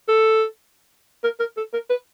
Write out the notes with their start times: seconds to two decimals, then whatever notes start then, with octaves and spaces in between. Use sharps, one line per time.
0.08 A4
1.24 A#4
1.39 A#4
1.57 A4
1.74 A#4
1.90 B4